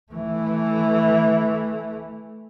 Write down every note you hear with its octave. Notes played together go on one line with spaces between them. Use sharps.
E3 A3